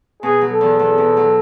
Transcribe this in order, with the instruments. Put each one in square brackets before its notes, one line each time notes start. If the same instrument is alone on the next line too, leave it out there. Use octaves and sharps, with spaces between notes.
[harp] B2 [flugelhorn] G#4
[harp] F#3
[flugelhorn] A4
[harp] E2
E2
B2
F#3